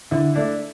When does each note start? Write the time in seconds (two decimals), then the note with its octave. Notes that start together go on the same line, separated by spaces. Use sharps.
0.11 D3 E4
0.35 A3 D4 E4